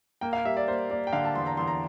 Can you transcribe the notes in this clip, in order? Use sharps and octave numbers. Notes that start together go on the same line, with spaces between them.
A#3 G5
F5
G3 E5
D5
A#3 C5
A#3 D5
G5
D3 F5
A5
E2 C6
A#5
E2 C6
A#5